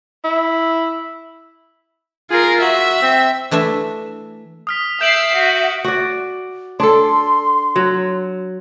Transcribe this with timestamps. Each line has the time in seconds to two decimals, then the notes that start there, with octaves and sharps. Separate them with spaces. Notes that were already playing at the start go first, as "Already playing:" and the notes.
0.24 E4
2.30 F4 G#4 A#4
2.61 F#4 E5
3.02 C4
3.51 E3 A3 D4 E5
4.67 D#6 F6 B6
5.01 E5 E6 G6 C7 D7 F#7
5.33 F#4
5.84 F#4 D5
6.80 D4 A4 C6
7.76 F#3